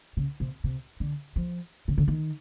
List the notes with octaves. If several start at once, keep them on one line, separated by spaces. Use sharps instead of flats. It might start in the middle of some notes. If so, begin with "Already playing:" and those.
C#3
C3
C3
D3
F3
C#3
D3
D#3